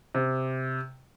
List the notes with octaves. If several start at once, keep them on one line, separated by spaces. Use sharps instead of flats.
C3